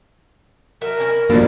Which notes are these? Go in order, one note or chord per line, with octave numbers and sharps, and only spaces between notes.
F#3 A#4 E5 A5
C#4 D4 E4
G2 B2 F3 A#3 D4 A4 B4